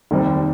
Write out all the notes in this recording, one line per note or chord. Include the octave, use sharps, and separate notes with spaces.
F1 D#2 D#3 G3 C4